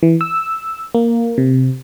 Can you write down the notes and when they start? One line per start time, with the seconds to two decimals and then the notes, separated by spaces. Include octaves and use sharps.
0.03 E3
0.21 E6
0.95 A#3
1.38 C3